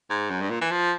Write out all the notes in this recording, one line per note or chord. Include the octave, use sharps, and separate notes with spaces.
G#2
F#2
G2
A#2
E3
F3